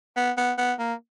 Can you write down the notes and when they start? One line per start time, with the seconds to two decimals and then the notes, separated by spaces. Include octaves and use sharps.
0.16 B3
0.37 B3
0.58 B3
0.79 A#3